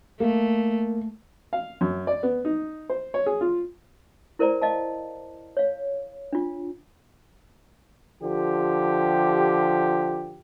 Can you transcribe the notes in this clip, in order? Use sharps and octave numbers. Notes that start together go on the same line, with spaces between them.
A3 A#3
F5
F#2
D5
B3
D#4
C5
C#5
G#4
F4
E4 A#4 C5 D5 A#5
D#5 F5 A5
C#5 F5
D4 F4
D3 F3 G4